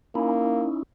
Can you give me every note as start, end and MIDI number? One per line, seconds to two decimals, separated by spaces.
0.15 0.66 58
0.15 0.83 61
0.15 0.83 63
0.15 0.83 64